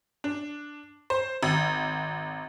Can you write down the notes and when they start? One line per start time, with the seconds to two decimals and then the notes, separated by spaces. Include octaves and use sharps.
0.24 D4
1.10 C5
1.43 G#1